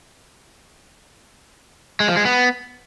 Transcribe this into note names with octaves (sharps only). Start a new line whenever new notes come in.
G#3
F3
G#3
B3